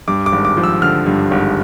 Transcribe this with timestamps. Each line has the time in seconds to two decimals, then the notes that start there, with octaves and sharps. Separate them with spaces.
0.08 G2 D6
0.26 D6
0.32 G#1
0.45 D6
0.57 F3
0.63 E6
0.82 D3 F6
1.06 G2
1.31 G#1